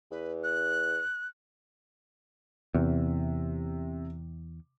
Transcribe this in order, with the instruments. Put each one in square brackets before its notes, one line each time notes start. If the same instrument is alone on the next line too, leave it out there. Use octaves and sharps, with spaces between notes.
[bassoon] E2 [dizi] B4
[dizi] F#6
[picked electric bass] E2 [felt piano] C3